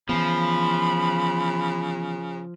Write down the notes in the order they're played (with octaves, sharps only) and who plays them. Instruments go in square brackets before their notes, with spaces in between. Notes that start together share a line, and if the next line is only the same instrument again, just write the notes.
[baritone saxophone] C#3 [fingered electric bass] E3 B3 [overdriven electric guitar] F3 [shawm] B5